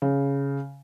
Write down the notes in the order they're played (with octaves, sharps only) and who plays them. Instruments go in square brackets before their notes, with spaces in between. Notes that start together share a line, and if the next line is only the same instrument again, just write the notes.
[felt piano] C#3